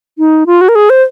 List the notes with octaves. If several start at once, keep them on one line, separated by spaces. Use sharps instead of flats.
D#4
F4
F#4
A#4
G#4
C5